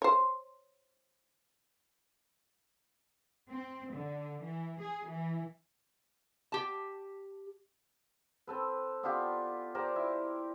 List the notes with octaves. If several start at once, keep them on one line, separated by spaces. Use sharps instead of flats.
C5 C#5
C4
D3
E3
G#4
E3
G4 A5
C4 A4 B4
B3 D4 F4 G4
G4 A#4 C5 D5
E4